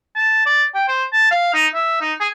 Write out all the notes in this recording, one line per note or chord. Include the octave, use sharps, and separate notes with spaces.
A5
D5
G5
C5
A5
F5
D#4
E5
D#4
G#4